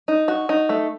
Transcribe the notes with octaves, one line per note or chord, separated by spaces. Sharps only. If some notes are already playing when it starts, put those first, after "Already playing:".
D#4
F#4
D#4
A3